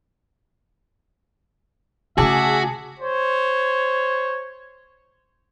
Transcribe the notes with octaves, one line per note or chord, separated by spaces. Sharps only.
C#3 A3 F#4 G#4 E5 A5 D6
C5 C#5